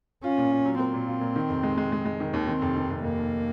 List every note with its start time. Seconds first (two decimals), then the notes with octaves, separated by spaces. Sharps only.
0.23 C#4 F4
0.38 A#2
0.52 F4
0.65 F#3
0.79 A#3 C4
0.94 A#2
1.07 F4
1.21 A#2
1.36 D#3
1.49 F1
1.63 G#3
1.77 G#3
1.92 G#3
2.06 G#3
2.20 D#3
2.33 D#2
2.47 D#3 C4
2.62 F1
2.77 D#3
2.90 F1
3.04 F1 A#3
3.18 F1